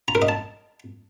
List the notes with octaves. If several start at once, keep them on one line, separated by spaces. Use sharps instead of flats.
A#5
A#4
D#5
A5